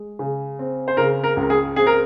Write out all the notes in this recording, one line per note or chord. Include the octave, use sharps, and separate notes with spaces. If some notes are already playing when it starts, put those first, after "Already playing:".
Already playing: G#3
C#3
C4
C5
C#3 A#4
A#4
C#2
A#4
G#4
C4 G#4
A#4